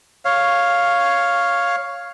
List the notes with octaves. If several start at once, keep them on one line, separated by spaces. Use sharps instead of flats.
C#5 F5